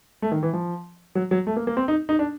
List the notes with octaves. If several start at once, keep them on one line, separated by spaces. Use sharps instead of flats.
A3
D#3
E3
F3
F#3
F#3
A3
A#3
A#3
C4
D#4
D#4
D4